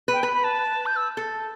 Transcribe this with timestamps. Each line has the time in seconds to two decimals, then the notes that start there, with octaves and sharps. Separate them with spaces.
0.08 B4
0.13 G5
0.23 B4 B5
0.33 B5
0.44 A5
0.86 G6
0.96 E6
1.17 A4